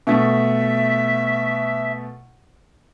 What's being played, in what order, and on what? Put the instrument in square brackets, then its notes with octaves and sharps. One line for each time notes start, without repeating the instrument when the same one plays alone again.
[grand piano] B2 A3 [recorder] E5